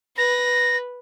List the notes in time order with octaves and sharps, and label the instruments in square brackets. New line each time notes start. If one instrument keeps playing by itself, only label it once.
[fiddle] B4 [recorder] A#6